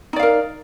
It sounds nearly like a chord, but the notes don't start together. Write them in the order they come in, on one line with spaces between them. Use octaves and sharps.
D#4 D5 F5 A#4